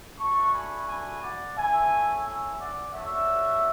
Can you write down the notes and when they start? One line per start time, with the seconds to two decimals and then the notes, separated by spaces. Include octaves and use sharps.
0.19 A3 D4 F#4 A5 C#6
0.54 G#5 B5
0.88 G#5 B5
1.22 D5 F#5
1.57 A3 C#4 E4 E5 G#5
2.26 E5 G#5
2.60 D5 F#5
2.94 A3 D4 F#4 C#5 E5